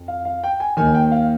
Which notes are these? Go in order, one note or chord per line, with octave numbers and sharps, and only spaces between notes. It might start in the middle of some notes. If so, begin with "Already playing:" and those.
Already playing: F2
F5
F5
G5
G#5
D#2 D#3 G#5
G5
F5